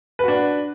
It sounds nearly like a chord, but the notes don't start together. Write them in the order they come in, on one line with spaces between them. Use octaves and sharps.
B4 F#4 D4